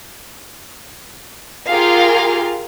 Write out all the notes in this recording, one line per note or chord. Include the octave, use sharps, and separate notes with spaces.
F4 G4 G#4 A#4 F5